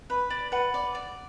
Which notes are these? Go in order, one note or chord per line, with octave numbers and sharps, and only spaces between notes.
B4 B5
D5
B4 F#5
D5
D5